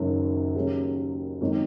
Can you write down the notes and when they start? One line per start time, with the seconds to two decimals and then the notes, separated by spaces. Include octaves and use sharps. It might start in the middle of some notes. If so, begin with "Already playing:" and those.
Already playing: F#1 F#2 D#3 F#3
0.55 D#2 C#3 F#3
1.41 G#1 D#3 F#3